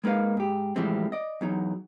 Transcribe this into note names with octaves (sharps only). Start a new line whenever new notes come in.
G#3 A#3 D#4 B4 F5
G#2 G4
A2 E3 F3 G3 G#3 C4
D5 D#5
E2 F#3 D#4